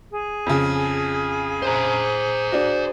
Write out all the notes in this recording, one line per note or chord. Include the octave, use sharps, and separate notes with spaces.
G#4
F2 C#3
C5 A#5
D4 F#4